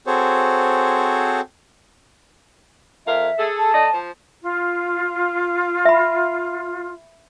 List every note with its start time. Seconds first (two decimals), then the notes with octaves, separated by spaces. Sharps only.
0.07 C4 F#4 G#4 A4 C5 C#5
3.07 F2 A#4 E5 F5
3.39 G#4 A4
3.58 A5
3.74 A3 D5 D#5
3.94 F3 C5
4.40 F4
5.85 E5 B5